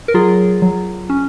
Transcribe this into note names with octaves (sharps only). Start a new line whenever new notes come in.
A#4
F#3 F4 G#4
F#3
C#4